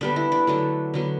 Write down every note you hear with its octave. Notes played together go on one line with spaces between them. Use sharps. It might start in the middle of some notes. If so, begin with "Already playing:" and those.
D3 G3 B3 D4
E4
D4
D3 F#3 A3
D3 F#3 B3